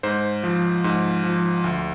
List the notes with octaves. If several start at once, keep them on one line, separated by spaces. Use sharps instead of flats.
G#2 C5
F3
G#2
F3
D2